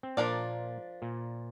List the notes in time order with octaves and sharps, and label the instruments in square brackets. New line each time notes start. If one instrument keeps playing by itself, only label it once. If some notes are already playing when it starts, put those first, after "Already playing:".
[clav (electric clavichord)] C4
[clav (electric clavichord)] A#2 A#3 [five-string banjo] F3 D4 A#4 D5
[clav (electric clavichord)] A#2